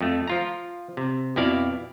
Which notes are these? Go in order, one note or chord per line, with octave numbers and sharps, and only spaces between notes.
F2 A3
F3 F4 A#5
C3
F2 B2 E4 D5 F5